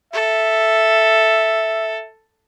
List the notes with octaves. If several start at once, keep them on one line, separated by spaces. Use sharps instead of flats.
A4 E5